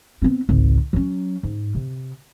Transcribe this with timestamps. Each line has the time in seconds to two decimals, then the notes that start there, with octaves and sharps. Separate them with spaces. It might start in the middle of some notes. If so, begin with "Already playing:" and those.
0.22 B3 C4
0.49 G#1 C#2
0.93 F#3 C#4
1.43 G#2
1.75 C3